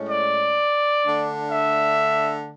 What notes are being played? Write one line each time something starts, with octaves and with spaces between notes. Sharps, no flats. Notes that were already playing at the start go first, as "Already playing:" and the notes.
Already playing: A2 G#3 C#4
D5
D3 A3 D4
E5